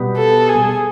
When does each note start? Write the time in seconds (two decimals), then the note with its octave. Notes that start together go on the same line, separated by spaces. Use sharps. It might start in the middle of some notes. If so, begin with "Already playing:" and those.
Already playing: B2 G3 B3
0.17 A4
0.49 G#4